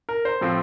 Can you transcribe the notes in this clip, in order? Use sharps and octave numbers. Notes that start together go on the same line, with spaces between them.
A#4
C5
A2 F3 A3 C4